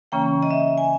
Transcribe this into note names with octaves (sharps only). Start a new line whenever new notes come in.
C#3 E3 A#3 C#4 G5
D#5
E5
G#5